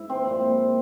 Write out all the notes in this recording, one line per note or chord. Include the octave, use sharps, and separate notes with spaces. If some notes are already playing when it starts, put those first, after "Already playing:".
Already playing: G#2 E4
C4
A#2 F3